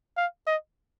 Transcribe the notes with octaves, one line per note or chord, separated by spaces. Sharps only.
F5
D#5